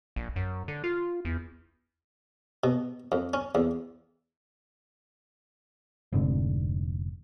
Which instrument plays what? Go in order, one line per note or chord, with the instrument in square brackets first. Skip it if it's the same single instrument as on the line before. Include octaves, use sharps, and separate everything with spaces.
[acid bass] A#1
F#2
D3
F4
E2
[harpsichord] B2
F2
C#4
E2
[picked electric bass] F1 F2 G#2 D3